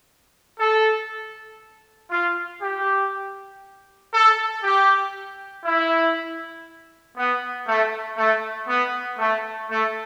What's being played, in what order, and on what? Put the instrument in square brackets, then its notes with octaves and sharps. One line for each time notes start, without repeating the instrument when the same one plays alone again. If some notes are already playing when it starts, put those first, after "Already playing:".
[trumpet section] A4
F4
G4
A4
G4
E4
B3
A3
A3
B3
A3
A3